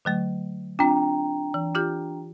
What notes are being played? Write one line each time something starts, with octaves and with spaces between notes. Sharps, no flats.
D3 F#3 A3
C4 D4 F4 G5 A#5
E3
F4 G4 G6